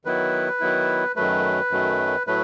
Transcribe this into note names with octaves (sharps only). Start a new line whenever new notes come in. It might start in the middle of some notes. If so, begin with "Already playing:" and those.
D#3 F#3 B3 E4 B4
D#3 F#3 B3 E4
F#2 D#3 F#3 A3 B4
F#2 D#3 F#3 A3
A2 F#3 A3 B4